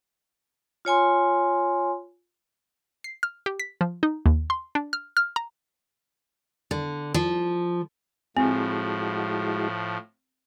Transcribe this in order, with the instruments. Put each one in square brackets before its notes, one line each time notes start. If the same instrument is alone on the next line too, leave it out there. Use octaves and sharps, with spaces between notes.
[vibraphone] F4 C#5 G#5 C6
[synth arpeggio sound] C7
F6
G4
B6
F3
D#4
D#2
C6
D4
F6
F6
A#5
[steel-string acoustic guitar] D3
F3
[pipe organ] A2 F3 [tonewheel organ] G#3 E4 F#4 [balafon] C4